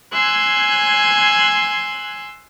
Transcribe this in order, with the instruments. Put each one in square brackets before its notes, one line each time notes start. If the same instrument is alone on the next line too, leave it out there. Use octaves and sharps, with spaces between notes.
[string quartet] G#5 C6 E6 F#6 G#6